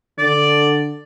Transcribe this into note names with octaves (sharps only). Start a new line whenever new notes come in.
D3 D5